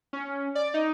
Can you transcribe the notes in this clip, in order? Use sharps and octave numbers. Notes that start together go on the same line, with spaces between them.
C#4
D5
D#4